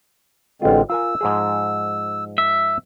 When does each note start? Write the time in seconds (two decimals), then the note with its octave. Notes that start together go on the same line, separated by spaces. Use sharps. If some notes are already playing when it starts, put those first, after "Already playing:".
0.62 A1 D3 G#3 C4 F4
0.90 F4 A#4 G#5 E6
1.21 G#2 F3 G#4
2.38 E5